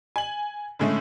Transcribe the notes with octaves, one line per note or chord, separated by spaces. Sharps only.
G#5 F#7
A2 D3 G#3 A3 C#4